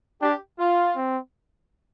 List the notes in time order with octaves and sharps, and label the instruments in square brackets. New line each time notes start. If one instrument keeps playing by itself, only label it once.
[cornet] D4 [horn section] G4
[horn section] F4
[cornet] C4